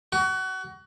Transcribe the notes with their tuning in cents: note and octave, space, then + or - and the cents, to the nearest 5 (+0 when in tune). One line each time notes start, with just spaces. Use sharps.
F#4 +25